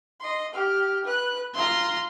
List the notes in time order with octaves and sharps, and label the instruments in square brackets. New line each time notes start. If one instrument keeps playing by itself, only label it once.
[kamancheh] D#5 C6
G4 F6
B4 F#6
[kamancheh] F4 A#5 [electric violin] C6